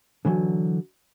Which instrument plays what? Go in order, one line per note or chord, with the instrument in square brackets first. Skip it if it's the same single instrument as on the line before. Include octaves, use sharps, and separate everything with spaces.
[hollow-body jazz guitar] D3 E3 F#3